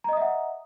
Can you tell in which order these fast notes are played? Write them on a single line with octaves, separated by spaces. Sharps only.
A#5 D#5 D#6 E5 F#5